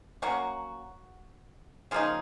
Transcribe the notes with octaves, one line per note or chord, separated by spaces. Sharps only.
F#3 A#3 C#4 F#4
C#3 F3 A#3 D#4 F4 G#4